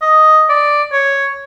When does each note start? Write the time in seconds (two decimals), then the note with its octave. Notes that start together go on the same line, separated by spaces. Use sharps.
0.02 D#5
0.49 D5
0.92 C#5